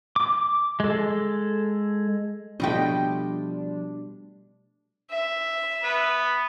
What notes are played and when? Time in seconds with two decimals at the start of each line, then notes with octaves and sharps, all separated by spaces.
0.16 D6
0.80 G#3 A4
2.60 B2 F3 G3 A3 D4 D#5 G5
5.11 E5
5.84 B3 B4